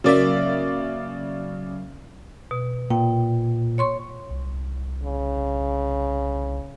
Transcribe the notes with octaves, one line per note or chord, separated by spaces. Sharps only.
C#3 F#3 A#3 D5 E5
B2
A#2 G5
C#5 C6 C#6
C2
C#3